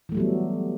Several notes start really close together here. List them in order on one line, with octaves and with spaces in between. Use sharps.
E3 A3 G3 F#3 B3